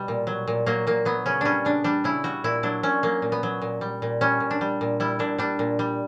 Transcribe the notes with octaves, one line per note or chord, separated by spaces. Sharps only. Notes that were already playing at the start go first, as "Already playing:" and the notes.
Already playing: B2 G3
A#2
F#3
A#2
F#3 A#3
A#2 A#3
F#3 B3
C#3 C#4
G3 C#4 D4
C#3 D4
G3 D4
C#3 E4
G3 F#4
A#2 E4
F#3 D4
A#2 C#4
F#3 A#3
A#2
B3
F#3
A#2
G3
A#2
G3 C#4
A#2
D4
G3
A#2
G3 E4
A#2 D4
G3 D4
A#2
G3